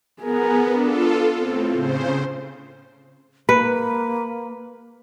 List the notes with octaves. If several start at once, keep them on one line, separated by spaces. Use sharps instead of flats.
B3 G#4 A#4
D4 F4 A4
A2 C4
C#3 C5
A#3 B4